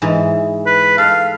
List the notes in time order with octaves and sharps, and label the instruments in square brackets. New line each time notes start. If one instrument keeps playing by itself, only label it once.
[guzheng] G#2 E3
[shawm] B4
[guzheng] A4 [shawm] F5